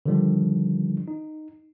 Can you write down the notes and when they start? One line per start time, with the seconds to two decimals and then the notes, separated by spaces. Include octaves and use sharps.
0.06 D3 D#3 F3 G3 D4
1.08 D#4